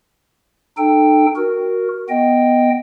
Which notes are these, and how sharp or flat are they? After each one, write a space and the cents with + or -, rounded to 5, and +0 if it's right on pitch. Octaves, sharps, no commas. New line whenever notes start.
D#4 -45 A4 +0 G5 +0
F#4 +0 A#4 +0
B3 +0 D#5 +0 G5 +0